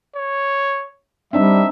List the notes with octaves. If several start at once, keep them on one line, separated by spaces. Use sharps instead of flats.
C#5
G3 C4 D4 D#4 E5